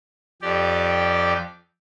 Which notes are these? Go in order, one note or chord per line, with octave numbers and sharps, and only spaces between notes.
F2 G4 D5